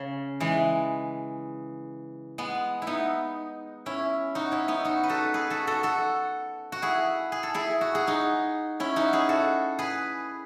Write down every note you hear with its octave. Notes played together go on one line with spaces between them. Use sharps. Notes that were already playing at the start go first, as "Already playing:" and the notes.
Already playing: C#3
E3 G#3
G#3 B3
E4
B3 D#4
C#4 E4
D#4 F#4
C#4 E4
B3 D#4
D#4 F#4
B4
F#4 A4
G#4 B4
F#4 A4
F#4 A4
F#4 A4
F#4
E4 G#4
G#4
A4
E4 G#4
F#4
G#4
D#4 F#4
C#4 E4
D#4 F#4
E4 G#4
F#4 A4
G#4 B4